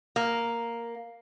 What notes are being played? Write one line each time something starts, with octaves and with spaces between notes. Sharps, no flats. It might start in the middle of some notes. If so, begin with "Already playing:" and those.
A#3